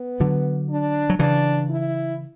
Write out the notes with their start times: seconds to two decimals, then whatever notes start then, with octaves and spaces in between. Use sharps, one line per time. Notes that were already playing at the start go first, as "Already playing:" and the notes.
Already playing: B3
0.20 D3 F#3
0.69 D4
1.10 F#3
1.19 C#3 E3 D4
1.70 E4